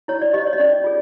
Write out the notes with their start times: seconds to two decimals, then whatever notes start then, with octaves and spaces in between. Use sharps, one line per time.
0.08 E4 C#5
0.21 D5
0.33 G4 C5 D#5
0.47 C#5
0.53 D#5
0.59 C#4 D5
0.84 F4 G#4